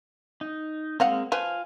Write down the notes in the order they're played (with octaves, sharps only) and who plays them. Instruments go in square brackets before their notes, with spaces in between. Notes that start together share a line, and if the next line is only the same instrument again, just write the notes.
[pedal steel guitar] D#4
[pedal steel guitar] G#3 A#3 C4 [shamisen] D#5 F5 F#5
[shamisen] F3 B4 [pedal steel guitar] F4 F5 G#5